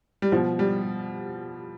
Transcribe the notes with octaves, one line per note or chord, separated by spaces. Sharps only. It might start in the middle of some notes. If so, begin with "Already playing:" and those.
G3
B2 F3
G3